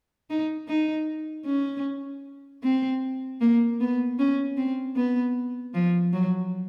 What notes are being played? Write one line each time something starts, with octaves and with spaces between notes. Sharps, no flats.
D#4
D#4
C#4
C4
A#3
B3
C#4
C4
B3
F3
F#3